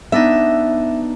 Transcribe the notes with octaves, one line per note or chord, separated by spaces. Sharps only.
B3 D4 D#4 E5